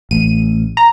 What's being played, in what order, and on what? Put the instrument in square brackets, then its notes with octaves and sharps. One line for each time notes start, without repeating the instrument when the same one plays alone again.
[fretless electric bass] A1 [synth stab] D#7
[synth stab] A#5